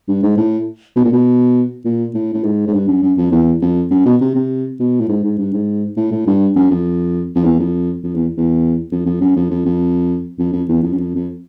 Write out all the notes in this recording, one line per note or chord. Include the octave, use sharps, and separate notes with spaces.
G2
G#2
A2
B2
A#2
B2
A#2
A2
A2
G#2
G#2
G2
F#2
F#2
F2
E2
F2
F#2
B2
C3
C3
B2
A2
G#2
G#2
G2
G#2
A2
A2
G2
F#2
F2
F2
E2
F2
F2
E2
E2
F2
F2
F#2
F2
F2
F2
F2
F2
E2
F2
F#2
F2
F2